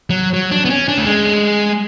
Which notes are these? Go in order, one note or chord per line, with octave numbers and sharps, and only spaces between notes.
F#3
F#3
D4
B3
C#4
D4
A3
G#3